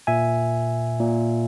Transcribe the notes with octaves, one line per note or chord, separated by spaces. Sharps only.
A#2 E5 G#5
A#2